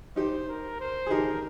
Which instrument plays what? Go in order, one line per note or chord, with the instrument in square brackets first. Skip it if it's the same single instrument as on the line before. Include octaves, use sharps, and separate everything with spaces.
[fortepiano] D#4 G4 [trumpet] C5
[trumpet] A#4
C5
[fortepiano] G#4
[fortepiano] D#4 G4 [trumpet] A#4